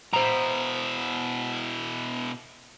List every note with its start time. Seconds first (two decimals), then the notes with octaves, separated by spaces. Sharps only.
0.13 B2 E4 C5 A#5